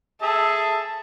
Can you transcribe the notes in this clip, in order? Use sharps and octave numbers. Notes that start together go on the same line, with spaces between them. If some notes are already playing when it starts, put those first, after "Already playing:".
G#4 A4 E5 A5